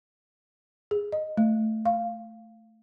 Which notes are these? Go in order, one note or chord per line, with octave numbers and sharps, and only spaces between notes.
G#4
D#5
A3
F5